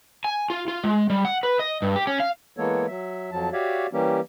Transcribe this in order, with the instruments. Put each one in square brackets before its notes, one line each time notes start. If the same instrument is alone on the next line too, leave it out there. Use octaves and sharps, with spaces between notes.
[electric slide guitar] G#5
F4
F4
G#3
G3
F#5
B4
D#5
G2
G4
C#4
F5
[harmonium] E3 G#3 A#3 B3 A4 C#5
F#3 E5
F2 F3 F#3 A5
F#4 G4 C#5 D5 E5 F5
E3 G3 A#3 C#4 G4